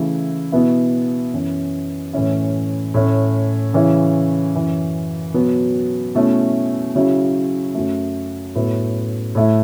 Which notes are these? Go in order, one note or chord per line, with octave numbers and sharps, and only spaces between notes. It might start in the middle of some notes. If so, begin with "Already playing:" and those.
Already playing: C#3 E3 A3 E4
B2 B3 E4
F#2 E3 C#4
A2 E3 C#4 E4
A2 A3 C#4
C#3 E3 C#4 E4
F#2 E3 C#4
B2 F#3 B3
B2 A3 C#4 E4
C#3 F#3 C#4 E4
F#2 F#3 A3
A2 F#3 B3 E4
A2 A3 E4